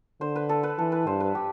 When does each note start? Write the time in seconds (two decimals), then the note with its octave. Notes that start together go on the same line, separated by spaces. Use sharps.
0.21 D3 C5
0.35 B4
0.49 A4
0.63 B4
0.78 E3 A4
0.92 B4
1.07 G2 C5
1.20 B4
1.35 G4